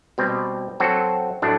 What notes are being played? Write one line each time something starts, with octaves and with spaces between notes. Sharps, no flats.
B2 G3 C4
F#3 C4 F#4 A4
A2 F#3 A3 D4